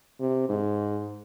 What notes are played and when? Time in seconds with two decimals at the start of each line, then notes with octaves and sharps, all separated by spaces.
0.20 C3
0.49 G#2